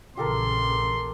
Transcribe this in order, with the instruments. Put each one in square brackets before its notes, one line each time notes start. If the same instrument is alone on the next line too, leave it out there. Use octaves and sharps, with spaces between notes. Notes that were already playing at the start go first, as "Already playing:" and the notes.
[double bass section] A#1 C#3 E3 [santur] G4 A4 A#4 [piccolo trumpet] C6